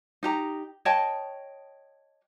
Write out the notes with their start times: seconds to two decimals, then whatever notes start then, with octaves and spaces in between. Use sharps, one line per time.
0.23 D#4 G4 A#5
0.85 C#5 D#5 G5 A5